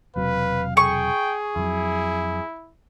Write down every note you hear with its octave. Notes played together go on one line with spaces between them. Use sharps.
E1 C3 F#3 B4 F5
G#4 G5 C#6
F2 F#3 E4